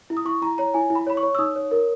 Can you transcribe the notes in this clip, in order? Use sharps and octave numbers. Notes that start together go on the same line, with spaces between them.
E4
D#6
E4 C#6
E4 A#5
C#5 A#5
E4 G#5
E4
B5
C#5 B5
C#6
C#5
E6
D#4 D#6
C#5
A#4